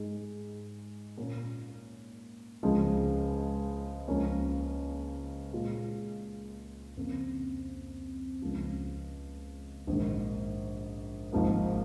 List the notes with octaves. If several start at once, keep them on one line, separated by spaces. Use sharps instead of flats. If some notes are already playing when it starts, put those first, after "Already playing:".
Already playing: G#2 G#3 D#4 G#4
A#2 A#3 C#4
C#2 C#3 F3 G#3
C#2 C#3 F3 A#3 C#4
A#2 G#3 F4
F2 C#3 A#3
C#2 C#3 F3
A#1 G#2 D#3
G#1 G#2 F3 A#3